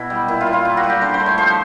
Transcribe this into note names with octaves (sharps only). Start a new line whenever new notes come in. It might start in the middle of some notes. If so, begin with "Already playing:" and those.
Already playing: B2 E4
G3
A#2 E4
F4
A#2
F4
G3 E4
F#4
G3
G4
D3 C5
C5
A3
C#5
F3 C5